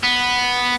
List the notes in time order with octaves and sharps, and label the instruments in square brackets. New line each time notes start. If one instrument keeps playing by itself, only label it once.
[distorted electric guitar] B3